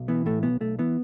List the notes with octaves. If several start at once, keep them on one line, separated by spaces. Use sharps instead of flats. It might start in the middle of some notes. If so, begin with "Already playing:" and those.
Already playing: B1
E3 B3
A2 A3
B1 B3
B1 A3
E3 B3